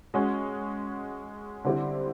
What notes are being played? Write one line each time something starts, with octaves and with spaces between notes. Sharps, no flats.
G#3 C#4 F#4
D3 G3 C4 E4 G4